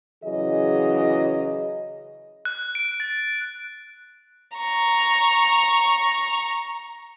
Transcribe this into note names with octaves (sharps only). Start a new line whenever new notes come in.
C#3 E3 F#3 G#4 D#5
F#6
D7
A6
A#5 C#6